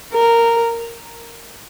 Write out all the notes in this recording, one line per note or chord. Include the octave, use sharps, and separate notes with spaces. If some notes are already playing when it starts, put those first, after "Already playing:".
A#4